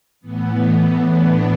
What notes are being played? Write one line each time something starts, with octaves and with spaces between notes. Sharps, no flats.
A2 E3 B3
D4